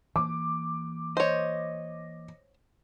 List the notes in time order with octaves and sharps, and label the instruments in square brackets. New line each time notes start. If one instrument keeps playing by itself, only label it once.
[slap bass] E3 A#3 [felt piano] D6
[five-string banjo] C5 C#5 [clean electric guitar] D#5